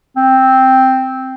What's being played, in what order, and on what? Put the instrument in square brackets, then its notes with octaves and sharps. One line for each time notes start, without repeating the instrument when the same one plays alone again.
[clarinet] C4